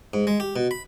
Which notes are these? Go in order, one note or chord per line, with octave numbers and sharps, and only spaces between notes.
G#2
G#3
G4
B2
B5